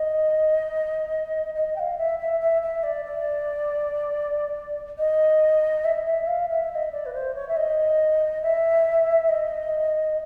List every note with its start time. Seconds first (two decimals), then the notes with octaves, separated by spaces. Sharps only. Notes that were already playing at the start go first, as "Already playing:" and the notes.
Already playing: D#5
1.55 D#5
1.76 G5
1.80 F5
1.98 E5
2.19 E5
2.40 E5
2.62 E5
2.83 D5
3.05 D5
4.98 D#5
5.85 E5
6.06 E5
6.27 F5
6.49 E5
6.71 E5
6.75 D#5
6.92 D5
7.06 B4
7.14 C5
7.35 C#5
7.48 E5
7.57 D#5
8.43 E5
9.29 D#5